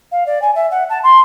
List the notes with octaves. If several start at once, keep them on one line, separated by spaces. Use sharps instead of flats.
F5
D5
G#5
E5
F#5
A5
C6